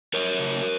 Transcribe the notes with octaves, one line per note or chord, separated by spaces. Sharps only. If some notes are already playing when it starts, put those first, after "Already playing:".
F#3 A#4 C#5
C#3